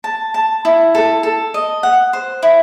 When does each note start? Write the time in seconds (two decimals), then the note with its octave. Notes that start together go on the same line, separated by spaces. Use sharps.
0.04 A5
0.34 A5
0.65 E4
0.95 A4
1.23 A4
1.54 D#5
1.83 F#5
2.13 C5
2.43 E4